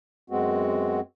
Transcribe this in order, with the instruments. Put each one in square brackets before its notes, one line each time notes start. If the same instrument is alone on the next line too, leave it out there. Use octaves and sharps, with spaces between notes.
[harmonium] F#2 G#3 B3 C4 F#4